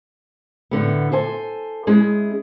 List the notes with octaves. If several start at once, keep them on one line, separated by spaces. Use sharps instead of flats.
A2 D3 B3
A4 C5 G#5
G#3 C#4 E4 G#4